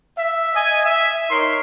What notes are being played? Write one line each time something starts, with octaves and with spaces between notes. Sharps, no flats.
E5
D#5 G#5
E5
D#4 A#4 C#5 C6